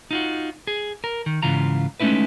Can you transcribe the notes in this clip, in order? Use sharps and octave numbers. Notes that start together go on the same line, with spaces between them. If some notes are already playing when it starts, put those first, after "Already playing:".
D#4 F4 F#4
G#4
A#4
D#3
G#2 C#3 E3 F4 A#5
G#3 A3 C#4 D#4 E4 B4